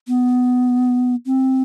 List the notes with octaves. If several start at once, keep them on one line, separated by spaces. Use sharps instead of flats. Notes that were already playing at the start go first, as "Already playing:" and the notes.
B3
C4